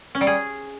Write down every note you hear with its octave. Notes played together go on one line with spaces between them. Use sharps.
C#4
G3
G#4